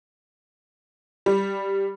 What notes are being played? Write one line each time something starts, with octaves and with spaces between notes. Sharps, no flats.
G3